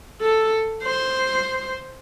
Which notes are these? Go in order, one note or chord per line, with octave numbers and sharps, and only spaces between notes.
A4
C5